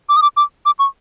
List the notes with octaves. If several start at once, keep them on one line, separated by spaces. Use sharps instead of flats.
D6
D#6
D6
D6
D6
C#6